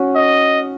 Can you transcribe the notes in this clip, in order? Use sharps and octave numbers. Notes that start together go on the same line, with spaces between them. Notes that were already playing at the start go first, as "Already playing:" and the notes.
Already playing: C#4 F#4
D#5